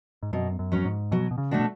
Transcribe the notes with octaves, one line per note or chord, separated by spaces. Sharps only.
G#2
F#2 B2
F#2
F#2 F#3 C#4
G#2
B2 F#3
B2
C#3
A3 D4 F#4 A4
B2